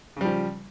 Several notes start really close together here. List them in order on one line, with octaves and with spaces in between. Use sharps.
C#3 G3 F3